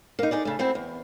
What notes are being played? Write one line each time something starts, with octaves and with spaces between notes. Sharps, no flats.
A#3 D#4
D#4 G#4 D5
C#3 A3
A3 C4 E4 F#4
E2